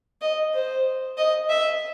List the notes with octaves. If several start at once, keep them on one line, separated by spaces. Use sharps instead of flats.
D#5
C5
D#5
E5